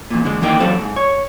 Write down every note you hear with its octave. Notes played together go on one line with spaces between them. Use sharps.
E2 A#2
D3 G#3
D#2 E3 G3 A#3 D#4 G5
F#3 C4 A4 C5 F5
G#2
C#5